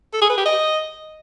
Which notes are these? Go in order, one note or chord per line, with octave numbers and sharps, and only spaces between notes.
A4
G#4
B4
G4
D#5